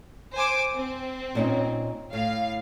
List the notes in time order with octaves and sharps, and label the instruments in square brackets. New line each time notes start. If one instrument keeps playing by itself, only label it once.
[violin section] C5 G#5 D6
C4
[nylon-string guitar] A#2 C#4 D#4
[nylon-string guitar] A2 [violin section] F5